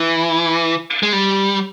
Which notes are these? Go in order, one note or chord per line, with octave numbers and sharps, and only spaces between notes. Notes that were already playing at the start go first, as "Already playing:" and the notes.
Already playing: E3
G#3
G3